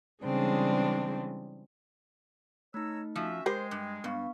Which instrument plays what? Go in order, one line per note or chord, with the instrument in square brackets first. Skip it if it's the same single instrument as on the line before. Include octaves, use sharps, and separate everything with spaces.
[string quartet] C#3 E3 G3 G#3 C4 D4
[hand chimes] A3 D#4 [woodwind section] C#5 A#5 E6
[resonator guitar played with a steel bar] F3 [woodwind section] C#4 F#4 E5
[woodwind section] G#3 [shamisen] G4 A#4 B5 [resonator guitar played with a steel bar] C5 [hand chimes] G5
[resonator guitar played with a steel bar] G2
[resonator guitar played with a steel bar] G2 [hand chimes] B3 F5 C#6